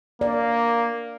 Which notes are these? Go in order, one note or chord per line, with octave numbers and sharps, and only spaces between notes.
A#3 D5